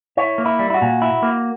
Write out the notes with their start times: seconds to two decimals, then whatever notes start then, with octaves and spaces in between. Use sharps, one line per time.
0.17 E4 C#5
0.38 A#3
0.46 E4
0.59 G3
0.70 E4
0.74 F#4
0.82 A#2
1.02 E4
1.23 A#3